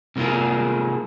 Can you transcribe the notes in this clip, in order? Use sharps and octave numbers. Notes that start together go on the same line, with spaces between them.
C3 G#3 A#3 F4 G#4